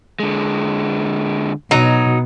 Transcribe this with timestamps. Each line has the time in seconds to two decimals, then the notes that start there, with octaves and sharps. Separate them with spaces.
0.20 D3 G#3
1.71 B2 F#3 D#4